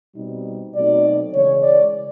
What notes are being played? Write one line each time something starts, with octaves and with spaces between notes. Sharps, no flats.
B2 G3 C4 D#4
B2 F#3 A3 C4 D#4 D5
C#3 E3 G#3 C#5
D5